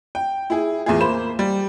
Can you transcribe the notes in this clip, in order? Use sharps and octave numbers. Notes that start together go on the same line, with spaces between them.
G5
E4 G#4
E2 A2 F4 G#4
A#3 C5 B5 E7
G3